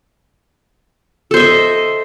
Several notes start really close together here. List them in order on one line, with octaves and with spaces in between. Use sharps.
A4 C5 E5 D#5